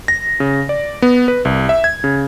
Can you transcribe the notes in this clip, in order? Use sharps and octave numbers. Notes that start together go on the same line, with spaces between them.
A#6
C#3
D5
B3
B4
C2
E5
G#6
C#3